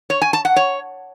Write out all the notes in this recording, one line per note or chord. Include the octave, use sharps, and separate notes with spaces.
C#5
G#5
A5
F#5
C#5